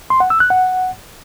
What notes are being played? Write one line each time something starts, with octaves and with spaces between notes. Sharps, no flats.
C6
F#5
E6
F#6
F#5